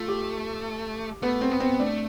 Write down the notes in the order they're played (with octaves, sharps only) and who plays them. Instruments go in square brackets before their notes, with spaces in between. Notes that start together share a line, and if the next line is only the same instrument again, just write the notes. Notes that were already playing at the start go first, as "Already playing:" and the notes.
Already playing: [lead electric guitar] A3 [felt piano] F4
[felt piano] G4
[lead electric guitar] A3 [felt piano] B3
[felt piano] C4
[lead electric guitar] B3
[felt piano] C4
[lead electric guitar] A3 [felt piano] D4